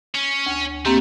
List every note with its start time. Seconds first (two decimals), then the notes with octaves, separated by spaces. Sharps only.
0.15 C#4
0.46 D2
0.85 A3 A#3 C4 G4